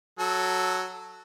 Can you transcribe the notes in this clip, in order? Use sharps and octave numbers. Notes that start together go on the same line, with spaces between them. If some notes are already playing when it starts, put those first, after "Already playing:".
F#3 A4